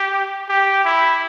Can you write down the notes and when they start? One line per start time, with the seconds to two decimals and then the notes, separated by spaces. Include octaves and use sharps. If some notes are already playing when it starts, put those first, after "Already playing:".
Already playing: G4
0.49 G4
0.85 E4